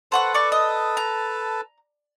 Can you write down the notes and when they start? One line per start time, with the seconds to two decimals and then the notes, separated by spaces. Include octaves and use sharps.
0.12 A4 B4 C5 F#5 A5 C#6
0.34 D5 C#6
0.52 D#5
0.97 A#5